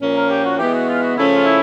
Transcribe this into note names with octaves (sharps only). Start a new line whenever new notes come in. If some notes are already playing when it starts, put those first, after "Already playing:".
A#2 F3 A#3 C#4
A#4
G4
F#4
E3 G#3 B3 G4
F#4
F4
F#4
C#3 F3 A3 C#4 E4
F4
E4